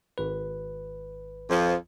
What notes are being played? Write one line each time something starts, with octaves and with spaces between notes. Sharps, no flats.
G#1 B4
F2 F3